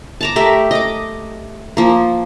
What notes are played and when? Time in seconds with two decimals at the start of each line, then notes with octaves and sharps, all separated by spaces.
0.21 A5 A#5 D6
0.36 A3 G4 A#4 E5
0.71 D#5 D6
1.77 F3 A#3